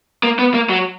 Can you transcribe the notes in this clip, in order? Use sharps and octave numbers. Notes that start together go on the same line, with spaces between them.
A#3
B3
A#3
F#3